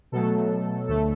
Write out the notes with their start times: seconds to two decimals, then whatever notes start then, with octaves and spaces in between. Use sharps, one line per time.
0.12 B2 F#3 A3 A4
0.88 D2 D3 A3 A4